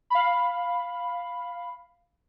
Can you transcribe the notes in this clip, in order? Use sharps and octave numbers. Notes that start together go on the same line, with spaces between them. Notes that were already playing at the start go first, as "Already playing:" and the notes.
F5 B5